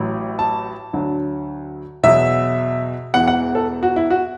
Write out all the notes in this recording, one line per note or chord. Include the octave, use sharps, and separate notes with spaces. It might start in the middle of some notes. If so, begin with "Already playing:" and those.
Already playing: A1 A2 F#3
A5
D2 D3 F#3
E2 B2 F#3 E5
E1 E2 E3 F#5
F#5
A4
F#4
E4
F#4